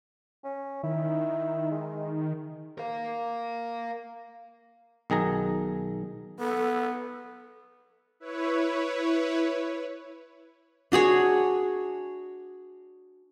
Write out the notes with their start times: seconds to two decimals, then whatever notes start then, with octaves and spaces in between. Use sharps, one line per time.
0.44 C#4
0.84 D#3 E4
1.71 G#3
2.78 A#4 F5
5.10 B1 D#3 G#4 A#5
6.40 B3 A4
8.20 E4 B4 C#5
10.92 D4 F#4 G#4 C#5